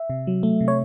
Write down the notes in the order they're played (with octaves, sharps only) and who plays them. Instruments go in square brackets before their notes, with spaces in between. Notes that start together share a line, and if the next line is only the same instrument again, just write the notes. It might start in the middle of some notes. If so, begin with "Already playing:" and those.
Already playing: [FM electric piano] E5
C3
F#3
A3
C3
C#5